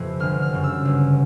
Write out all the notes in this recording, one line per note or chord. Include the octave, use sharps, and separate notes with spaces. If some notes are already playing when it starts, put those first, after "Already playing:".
Already playing: F2 C3 E3
G1 F6
F6
F#2 C#3
E6
G1